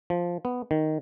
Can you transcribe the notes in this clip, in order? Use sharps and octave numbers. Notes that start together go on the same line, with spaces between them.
F3
B3
D#3